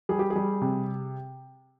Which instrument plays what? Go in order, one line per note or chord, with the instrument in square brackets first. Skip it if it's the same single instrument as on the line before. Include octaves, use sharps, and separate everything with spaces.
[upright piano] G3 G#4
G4
G#4
G3
C3